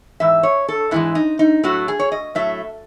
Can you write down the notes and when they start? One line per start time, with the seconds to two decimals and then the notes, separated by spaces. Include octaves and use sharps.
0.20 G#2 E3 E5
0.43 C#5
0.68 A4
0.91 G#2 E3 G#3 E4
1.15 D#4
1.39 D#4
1.64 A2 F#3 A3 F#4
1.88 G#4
2.00 C#5
2.12 D#5
2.35 A2 F#3 A3 E5